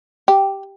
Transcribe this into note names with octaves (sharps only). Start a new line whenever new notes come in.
G4